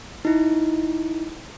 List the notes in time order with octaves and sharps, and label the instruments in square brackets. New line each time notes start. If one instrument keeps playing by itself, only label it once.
[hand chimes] D#4 E4